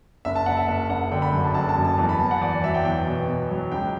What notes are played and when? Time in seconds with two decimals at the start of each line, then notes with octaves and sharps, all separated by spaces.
0.25 F#1 E5
0.36 A5
0.46 F#1 F#5
0.57 E5
0.68 F#1 E5
0.90 F#1 F#5
1.11 D3 G5
1.22 B5
1.33 F#2
1.44 A5
1.54 F#1 A5
1.69 A5
1.77 F#2
1.84 A5
1.98 E2 A5
2.09 B5
2.20 E2 A5
2.31 F#5
2.41 E2 D5
2.53 D5
2.63 F#3 E5
2.74 G5
2.85 E2 G5
3.06 B2
3.28 B2
3.50 F#3
3.72 C#2 G5